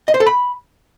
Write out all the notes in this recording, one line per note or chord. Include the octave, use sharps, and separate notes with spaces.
D#5
C5
A4
B5